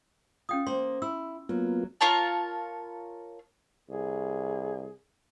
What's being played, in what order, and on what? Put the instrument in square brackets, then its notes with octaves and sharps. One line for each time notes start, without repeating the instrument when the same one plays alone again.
[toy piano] C#4 G5 D#6 [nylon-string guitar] F4
[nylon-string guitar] A#3 C5 [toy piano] C6
[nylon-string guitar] E4 [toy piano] E6
[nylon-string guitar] F#3 [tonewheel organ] A#3 B3 F4
[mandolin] F4 A#4 C#5 A5
[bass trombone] C2 [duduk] G#4